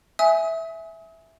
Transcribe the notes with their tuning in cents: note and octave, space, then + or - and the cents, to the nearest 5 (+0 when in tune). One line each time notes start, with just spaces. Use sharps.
E5 -5 G#5 +0 D#6 +40